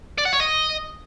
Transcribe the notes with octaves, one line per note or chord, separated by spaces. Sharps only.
D5
F#5
C#5
D#5